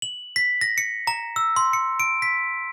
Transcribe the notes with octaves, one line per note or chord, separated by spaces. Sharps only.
F#7
B6
A#6
C#7
A#5
E6
C6
C#7
D7
B6